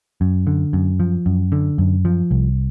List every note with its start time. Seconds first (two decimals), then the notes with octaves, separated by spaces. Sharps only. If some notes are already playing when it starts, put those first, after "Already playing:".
0.21 F#2
0.47 D3
0.73 F#2
1.00 F3
1.26 F#2
1.52 D3
1.78 F#2
2.05 F3
2.31 C2